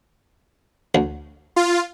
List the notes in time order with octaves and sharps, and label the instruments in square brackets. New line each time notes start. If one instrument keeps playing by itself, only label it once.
[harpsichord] D2
[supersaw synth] F4